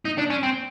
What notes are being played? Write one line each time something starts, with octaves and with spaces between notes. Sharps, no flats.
D#4
D4
C#4
C4